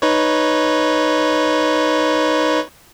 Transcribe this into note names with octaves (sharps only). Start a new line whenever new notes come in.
D#4 B4 C#5